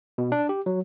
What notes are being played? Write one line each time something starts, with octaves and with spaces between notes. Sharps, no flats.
B2
D4
G4
F#3